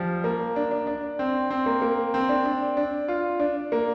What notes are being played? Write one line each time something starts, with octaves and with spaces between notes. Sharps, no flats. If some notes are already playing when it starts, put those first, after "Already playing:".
Already playing: F3 G3
A#3
D4
D4
D4
C4
C4
A#3
A#3
C4
D4
D4
D4
F4
D4
A#3